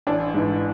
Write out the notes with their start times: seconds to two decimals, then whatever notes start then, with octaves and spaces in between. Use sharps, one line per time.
0.07 A1 D4
0.34 G#2 E3